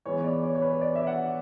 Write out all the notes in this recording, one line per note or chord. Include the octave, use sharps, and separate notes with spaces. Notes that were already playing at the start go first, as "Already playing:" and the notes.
E3 G#3 B3 C#5
D5
C#5
C#5
B4
D5
E5
F#5